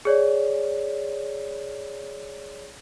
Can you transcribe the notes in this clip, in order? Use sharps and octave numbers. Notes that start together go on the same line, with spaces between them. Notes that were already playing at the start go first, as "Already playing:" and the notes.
G#4 C#5 D5